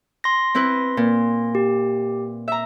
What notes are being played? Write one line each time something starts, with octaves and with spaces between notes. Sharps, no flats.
C6 A#6
C4 E4 B4
A#2
G4
E5 A#5